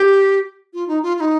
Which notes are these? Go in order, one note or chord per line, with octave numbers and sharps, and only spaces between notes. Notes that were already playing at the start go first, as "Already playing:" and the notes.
Already playing: G4
F4
D#4
F4
F4
D#4